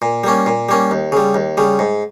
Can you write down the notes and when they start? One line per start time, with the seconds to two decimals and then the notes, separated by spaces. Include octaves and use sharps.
0.02 A#2
0.24 G3 A#3 C#4
0.46 A#2
0.69 G3 A#3 C#4
0.91 D#2
1.12 C#3 G3
1.34 D#2
1.57 C#3 G3
1.79 G#2